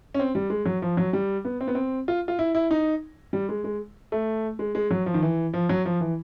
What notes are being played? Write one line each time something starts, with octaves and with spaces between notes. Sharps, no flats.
C#4
C4
G3
G#3
F#3
F3
F#3
G3
B3
C4
B3
C4
F4
F4
E4
E4
D#4
G3
G#3
G#3
A3
G#3
G#3
F#3
F3
D#3
E3
F3
F#3
F3
E3